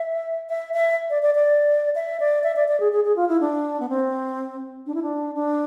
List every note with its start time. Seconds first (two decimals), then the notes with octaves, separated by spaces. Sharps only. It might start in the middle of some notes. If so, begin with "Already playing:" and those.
Already playing: E5
0.49 E5
0.74 E5
1.10 D5
1.22 D5
1.35 D5
1.95 E5
2.20 D5
2.44 E5
2.56 D5
2.68 D5
2.80 G#4
2.92 G#4
3.04 G#4
3.16 F4
3.29 E4
3.41 D4
3.80 B3
3.89 C4
4.86 D4
4.94 E4
5.03 D4
5.35 D4